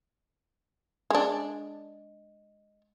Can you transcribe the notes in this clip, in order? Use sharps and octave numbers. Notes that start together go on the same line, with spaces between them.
G#3 D4